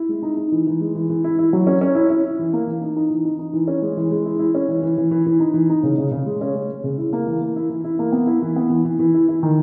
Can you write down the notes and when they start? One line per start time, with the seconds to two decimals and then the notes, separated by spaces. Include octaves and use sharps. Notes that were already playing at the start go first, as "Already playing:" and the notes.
Already playing: E4
0.09 G#3
0.23 D#4
0.37 D#4
0.52 E3
0.67 E3
0.81 G#3
0.95 E3
1.10 E3
1.24 E4
1.39 E4
1.53 F#3
1.67 C#4
1.81 C#4
1.95 E4
2.10 E4
2.25 E4
2.39 E3
2.53 A#3
2.67 E3
2.82 D#4
2.96 D#4
3.10 E3
3.25 D#4
3.39 D#4
3.54 E3
3.68 C#4
3.82 G#3
3.97 E3
4.11 G#3
4.25 E4
4.39 E4
4.55 C#4
4.68 E3
4.83 E3
4.97 E3
5.11 E3
5.26 E3
5.40 D#4
5.54 E3
5.69 D#4
5.83 C#3
5.98 C#3
6.11 C#3
6.26 G#3
6.41 C#4
6.55 G#3
6.69 G#3
6.84 C#3
6.98 E4
7.13 A#3
7.27 E3
7.41 A#3
7.56 E4
7.70 E3
7.84 E4
7.99 A#3
8.12 B3
8.27 E4
8.42 E3
8.56 B3
8.70 E3
8.85 E3
8.99 E3
9.14 E4
9.29 E4
9.43 D#3